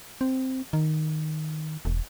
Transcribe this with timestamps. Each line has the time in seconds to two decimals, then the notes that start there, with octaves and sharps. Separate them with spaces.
0.21 C4
0.73 D#3
1.85 E1